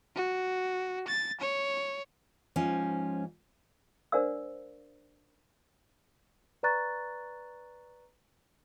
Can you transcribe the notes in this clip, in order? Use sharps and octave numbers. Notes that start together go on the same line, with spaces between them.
F#4
A6
C#5
G#2 F3 C#4
D4 A#4 C5 D5 F5 E6
B4 D5 A#5 C#6 F#6 A6